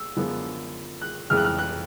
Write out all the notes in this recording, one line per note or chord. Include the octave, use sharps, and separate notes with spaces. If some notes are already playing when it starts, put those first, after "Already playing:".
Already playing: E6
F#2 D3 F3 G#3 B3
F#6
F2 C#3 E3 G#3 F6
F#6
F6
F#6